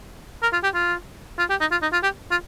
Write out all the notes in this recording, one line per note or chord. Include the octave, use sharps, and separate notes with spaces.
A#4
F4
G4
F4
F4
G4
D#4
F4
D#4
F4
G4
F4